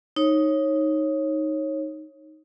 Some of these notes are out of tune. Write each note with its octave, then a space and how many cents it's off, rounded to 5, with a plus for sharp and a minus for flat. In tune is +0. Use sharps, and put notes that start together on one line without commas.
D#4 +5 C#5 -20